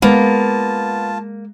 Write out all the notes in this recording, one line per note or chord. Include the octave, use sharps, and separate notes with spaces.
G#3 A#3 B3 F4 A5